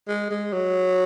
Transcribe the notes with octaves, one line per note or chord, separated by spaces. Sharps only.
G#3
G#3
F#3